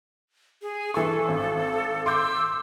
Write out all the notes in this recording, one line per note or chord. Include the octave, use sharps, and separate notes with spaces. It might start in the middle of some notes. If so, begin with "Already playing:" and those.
G#4
E3 A4 C#6
G#1 C#6
C6 D6 E6 G6